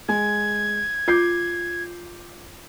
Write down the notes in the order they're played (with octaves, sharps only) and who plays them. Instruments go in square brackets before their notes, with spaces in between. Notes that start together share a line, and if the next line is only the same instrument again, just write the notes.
[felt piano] G#3 G#5 [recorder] G#6
[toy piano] F4 [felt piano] D6 G6 C7